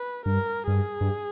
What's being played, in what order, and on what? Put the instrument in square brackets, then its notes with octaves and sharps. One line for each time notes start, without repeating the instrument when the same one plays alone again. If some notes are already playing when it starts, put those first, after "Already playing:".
Already playing: [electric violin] B4
[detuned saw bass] G2 [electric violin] A#4
[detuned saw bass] G2 [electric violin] G#4
[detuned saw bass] G2